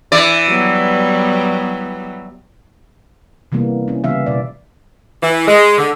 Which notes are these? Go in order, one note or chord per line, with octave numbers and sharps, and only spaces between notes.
E3 D5
F#3 G3 B3
C3 E3 G3 A#3 B3
C#4 E4
C#3 E3 G3 B3 E5 F5
B2 D5
E3
G#3
D3